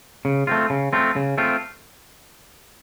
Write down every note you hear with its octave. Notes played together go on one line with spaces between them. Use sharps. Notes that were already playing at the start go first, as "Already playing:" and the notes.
C#3
A3 C4 F4
C#3
A3 C4 F4
C#3
A3 C4 F4